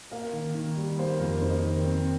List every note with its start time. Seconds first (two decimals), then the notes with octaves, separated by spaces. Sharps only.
0.11 A#3 A#4
0.33 D#3
0.55 D#3
0.77 G3
0.99 A#3 C5
1.20 F2 A#4
1.41 D#4 C5
1.63 D#3 A#4
1.86 C4